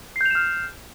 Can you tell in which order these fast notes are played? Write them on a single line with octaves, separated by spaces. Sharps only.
C7 G6 F7 E7 F6